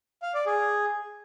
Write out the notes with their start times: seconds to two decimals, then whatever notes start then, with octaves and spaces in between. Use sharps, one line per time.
0.22 F5
0.34 D5
0.46 G#4